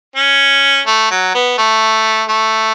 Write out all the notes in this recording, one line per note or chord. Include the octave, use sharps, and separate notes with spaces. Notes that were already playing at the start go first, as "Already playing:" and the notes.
C#4
A3
F#3
B3
A3
A3